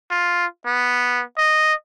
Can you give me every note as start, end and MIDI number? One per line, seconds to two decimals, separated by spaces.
0.11 0.46 65
0.66 1.22 59
1.38 1.74 75